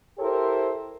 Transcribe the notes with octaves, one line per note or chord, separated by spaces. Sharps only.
E4 G4 A4 A#4 C5